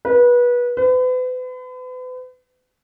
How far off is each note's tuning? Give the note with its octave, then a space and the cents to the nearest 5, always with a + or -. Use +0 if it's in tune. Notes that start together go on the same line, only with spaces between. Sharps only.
B4 -25
B4 +40